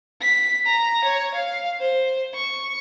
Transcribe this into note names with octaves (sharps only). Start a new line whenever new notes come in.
B6
A#5
C#5
F5
C5
C#6